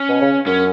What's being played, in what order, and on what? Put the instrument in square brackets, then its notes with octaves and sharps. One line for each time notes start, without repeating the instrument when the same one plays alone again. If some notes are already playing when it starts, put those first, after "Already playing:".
Already playing: [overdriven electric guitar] C#4
[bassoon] B2
C#3
[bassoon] F#2 [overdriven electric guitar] C#4